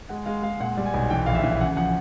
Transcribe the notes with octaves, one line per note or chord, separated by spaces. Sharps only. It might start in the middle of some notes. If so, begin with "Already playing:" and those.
G#3 F#5
G#3 F5
G#3 F5
A#2 F#5
G3
G#5
B1
E3 G5
A#1 F5
E5
E3
C#3 F#5
F3 F#5